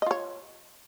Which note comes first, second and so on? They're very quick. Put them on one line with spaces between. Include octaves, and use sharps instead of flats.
D#5 F4 C#5